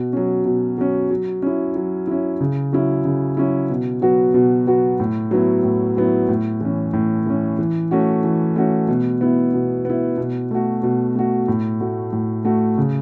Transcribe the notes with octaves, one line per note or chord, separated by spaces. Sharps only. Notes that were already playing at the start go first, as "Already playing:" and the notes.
Already playing: B2
F#3 C#4
B2
F#3 C#4
F#3
C#4 E4
F#3
C#4 E4
C#3
F#3 C#4 E4
C#3
F#3 C#4 E4
B2
F#3 B3 F#4
B2
F#3 B3 F#4
A2
F#3 B3 E4
A2
F#3 B3 E4
A2
E3 C#4
A2
E3 C#4
E3
A3 C#4 F#4
E3
A3 C#4 F#4
B2
B3 E4
B2
B3 E4
B2
A3 F#4
B2
A3 F#4
A2
A3 F#4
A2
A3 F#4
C#3